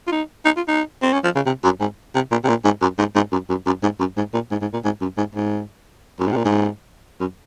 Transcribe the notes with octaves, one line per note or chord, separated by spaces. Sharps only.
F4
D#4
D#4
F4
D#4
C4
C#4
F3
C#3
C3
F#2
G#2
C3
A#2
C3
A#2
G#2
F#2
G#2
G#2
F#2
F#2
F#2
G#2
F#2
G#2
A#2
G#2
G#2
A#2
G#2
F#2
G#2
G#2
F#2
G#2
C3
A#2
G#2
F#2